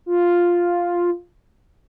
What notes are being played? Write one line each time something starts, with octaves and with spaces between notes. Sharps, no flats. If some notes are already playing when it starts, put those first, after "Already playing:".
F4